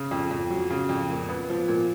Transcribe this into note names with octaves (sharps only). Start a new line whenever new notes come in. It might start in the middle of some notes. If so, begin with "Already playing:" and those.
Already playing: C#3
F2
F2
F#3
C#3
F2
A#2
B3
F3
A#2